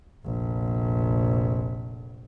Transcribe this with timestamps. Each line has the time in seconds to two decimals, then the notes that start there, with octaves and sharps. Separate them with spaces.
0.25 F1 A#1